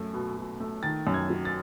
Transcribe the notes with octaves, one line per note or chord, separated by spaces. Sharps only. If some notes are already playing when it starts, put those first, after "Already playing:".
Already playing: F#2 A3
B2
B2
A3
D#3 A6
F#2
G#6
F#3
A6